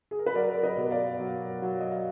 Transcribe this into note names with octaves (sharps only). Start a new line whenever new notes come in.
G#4
A#4
B4
F#3 A#4 D5
D5
B4 D#5
B2
D5 F5
F#3
F#3
D#5
F5